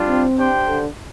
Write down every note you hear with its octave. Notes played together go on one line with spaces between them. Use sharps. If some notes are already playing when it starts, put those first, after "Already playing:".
Already playing: G3 D4 F4
C4
D4 G4 C5 G5
D3